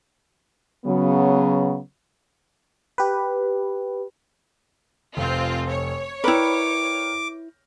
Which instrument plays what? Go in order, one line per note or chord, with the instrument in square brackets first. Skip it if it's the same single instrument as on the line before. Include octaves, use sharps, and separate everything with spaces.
[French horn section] C#3 F#3 B3
[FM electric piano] G4 B4
[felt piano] F1 [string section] C4 F4
[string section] C#5
[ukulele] E4 B4 [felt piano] A#4 D5 G5 [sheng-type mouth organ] D6